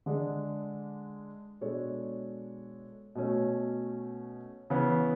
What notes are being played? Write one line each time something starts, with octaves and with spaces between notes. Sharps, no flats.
D3 G#3 D4
B2 G#3 D4 A4 C#5
B2 A3 C#4
C#3 E3 B3